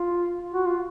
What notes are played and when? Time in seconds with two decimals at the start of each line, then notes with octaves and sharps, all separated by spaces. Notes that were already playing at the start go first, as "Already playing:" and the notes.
Already playing: F4
0.54 F#4
0.67 F4